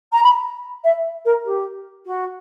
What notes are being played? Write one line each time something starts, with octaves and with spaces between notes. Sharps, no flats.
A#5
B5
E5
A#4
G4
F#4